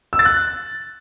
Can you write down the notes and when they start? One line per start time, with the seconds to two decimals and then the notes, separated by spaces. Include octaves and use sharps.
0.13 E6
0.19 A6
0.25 F#6